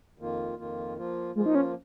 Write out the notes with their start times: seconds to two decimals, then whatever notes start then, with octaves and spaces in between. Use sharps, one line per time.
0.18 F2 D#3 A#3 F4
0.57 F2 D#3 A#3 F4
0.96 F3 A#3 F4
1.35 F3 G#3 A#3 F4
1.46 D#4
1.55 C#4